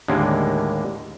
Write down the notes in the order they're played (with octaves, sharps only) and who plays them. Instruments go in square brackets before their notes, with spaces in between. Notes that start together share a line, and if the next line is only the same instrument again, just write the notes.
[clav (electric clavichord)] D#2 A2 D3 G#3 A#3